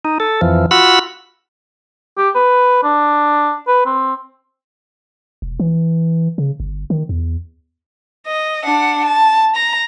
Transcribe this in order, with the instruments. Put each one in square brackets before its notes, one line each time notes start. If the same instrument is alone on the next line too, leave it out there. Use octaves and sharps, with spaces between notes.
[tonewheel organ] D#4
A4
F2 E3 F3
F4 F#4 F#5 B5 E6
[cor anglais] G4
B4
D4
B4
C4
[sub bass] E1
E3
C#3
G1
D#3
E2
[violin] D#5
D4 F#5
A5
A#5